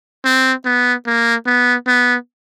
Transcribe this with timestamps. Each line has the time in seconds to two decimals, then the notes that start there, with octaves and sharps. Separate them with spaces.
0.25 C4
0.65 B3
1.06 A#3
1.46 B3
1.87 B3